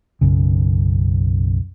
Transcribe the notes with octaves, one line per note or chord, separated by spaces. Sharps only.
B1 F#2 C#3